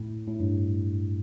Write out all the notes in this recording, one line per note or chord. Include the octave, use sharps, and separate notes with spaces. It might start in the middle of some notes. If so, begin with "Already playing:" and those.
Already playing: A2
A2
G2